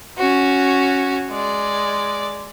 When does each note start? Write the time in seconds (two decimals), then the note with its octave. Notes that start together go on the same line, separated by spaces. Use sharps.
0.18 C#4 F#4
1.30 G#3 D5